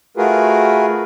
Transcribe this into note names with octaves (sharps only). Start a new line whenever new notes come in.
A3 F4 F#4 G#4 A#4 B4